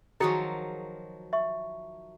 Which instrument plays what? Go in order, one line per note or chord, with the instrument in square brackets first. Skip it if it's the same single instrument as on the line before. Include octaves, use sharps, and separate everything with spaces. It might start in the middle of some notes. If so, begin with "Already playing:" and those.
[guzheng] D#3 F3 F#3 [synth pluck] F#4 G#4 [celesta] A#5 A6 C#7
[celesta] E5 C#6